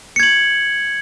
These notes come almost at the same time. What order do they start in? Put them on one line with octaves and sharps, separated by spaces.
C#7 G#6 F#7